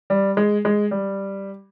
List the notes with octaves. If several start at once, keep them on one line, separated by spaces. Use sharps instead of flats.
G3
G#3
G#3
G3